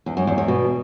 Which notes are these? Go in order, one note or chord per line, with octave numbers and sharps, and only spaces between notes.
E2
F#2
E2
E2
B2